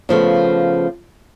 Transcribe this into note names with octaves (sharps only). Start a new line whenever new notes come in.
C#3 F3 A3 B3